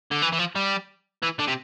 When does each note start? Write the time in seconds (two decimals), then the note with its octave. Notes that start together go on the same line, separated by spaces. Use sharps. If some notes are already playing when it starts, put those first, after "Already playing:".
0.12 D3
0.22 E3
0.33 E3
0.39 F3
0.56 G3
1.23 E3
1.39 D3
1.47 C3